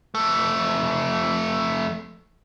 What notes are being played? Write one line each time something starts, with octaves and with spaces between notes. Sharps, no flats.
F2 A3